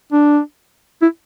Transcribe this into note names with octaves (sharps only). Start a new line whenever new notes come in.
D4
E4